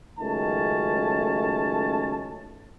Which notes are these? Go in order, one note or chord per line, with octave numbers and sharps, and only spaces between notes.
C#2 D#3 F#3 A3 C#4 A5